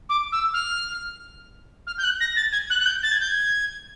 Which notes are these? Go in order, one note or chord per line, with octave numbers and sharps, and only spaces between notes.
D6
E6
F6
F6
G6
F#6
A#6
A6
G#6
F#6
F#6
G6
A6
G#6
G6
G#6